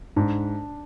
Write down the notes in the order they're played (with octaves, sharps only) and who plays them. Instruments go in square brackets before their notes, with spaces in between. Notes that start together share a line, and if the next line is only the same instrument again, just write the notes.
[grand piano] G#2 [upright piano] D4